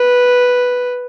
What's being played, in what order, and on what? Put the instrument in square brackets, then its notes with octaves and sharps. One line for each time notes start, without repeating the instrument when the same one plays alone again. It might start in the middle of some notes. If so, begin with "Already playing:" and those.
Already playing: [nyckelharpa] B4